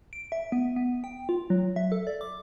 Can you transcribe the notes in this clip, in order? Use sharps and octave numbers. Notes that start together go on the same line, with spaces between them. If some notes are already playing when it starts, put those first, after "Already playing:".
D7
E5
B3
B3
G5
F4
F#3
E5
A4
D5
D6